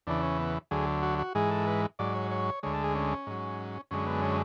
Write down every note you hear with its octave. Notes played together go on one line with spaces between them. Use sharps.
E2 C#3 E3 D4
C#4
B3
D2 D3 F#3 G#4
F#4
F#4
G#2 E3 G#3 G#4
A4
B4
G#2 F#3 D5
C#5
C#5
D2 D3 G#3 C#5
A4
G#4
C#4
G#2 F#3
F#2 D3 G#3 C#4
B3
C#4